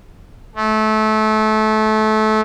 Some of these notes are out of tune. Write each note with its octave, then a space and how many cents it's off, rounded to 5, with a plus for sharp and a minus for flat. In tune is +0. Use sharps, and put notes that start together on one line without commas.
A3 -25